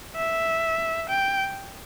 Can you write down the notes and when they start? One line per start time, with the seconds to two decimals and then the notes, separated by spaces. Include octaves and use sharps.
0.16 E5
1.10 G5